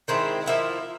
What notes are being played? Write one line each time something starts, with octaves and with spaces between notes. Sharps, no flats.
D#3 G#3 C4 E4
F3 A#3 E4 E5